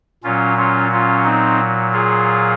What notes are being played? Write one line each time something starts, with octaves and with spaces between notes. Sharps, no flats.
A#2 F#3 C#4 F4
C#4 F4
C#4 F4
C4 D#4
F4 G#4